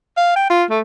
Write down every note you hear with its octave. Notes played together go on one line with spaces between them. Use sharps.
F5
G5
F4
A3